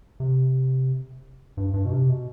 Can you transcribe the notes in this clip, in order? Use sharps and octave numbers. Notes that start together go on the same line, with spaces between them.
C3
G2
G2
B2
C3
B2